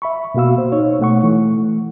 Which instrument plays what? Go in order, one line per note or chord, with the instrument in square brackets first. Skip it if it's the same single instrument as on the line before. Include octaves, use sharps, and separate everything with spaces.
[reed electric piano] E5 B5 C#6
B2 A#3 F#4 F5 E6
C5
D#4 C#5
B2 A3 F#5 C#6
E3 A3